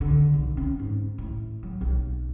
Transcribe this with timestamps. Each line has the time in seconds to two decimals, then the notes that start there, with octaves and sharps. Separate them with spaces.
0.01 D3
0.33 B1
0.57 C#4
0.79 G#2
1.18 A2
1.63 F#3
1.81 B1